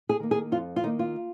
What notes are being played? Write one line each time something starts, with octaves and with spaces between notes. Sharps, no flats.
G#4
D#3 A#3
G#4
F2 F4
F4
D#3 A#3 D#4
F4